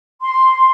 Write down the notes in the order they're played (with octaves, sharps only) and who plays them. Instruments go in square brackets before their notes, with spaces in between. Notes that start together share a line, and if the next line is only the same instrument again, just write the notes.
[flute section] C6